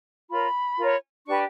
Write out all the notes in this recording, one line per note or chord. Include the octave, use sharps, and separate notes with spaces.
F4 A#4 C#5 B5
F4 A#4 C#5
D4 G4 B4 C#6